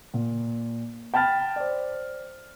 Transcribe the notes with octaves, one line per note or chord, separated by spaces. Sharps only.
A#2
G5 A5 B5 F6 A6
C5 D5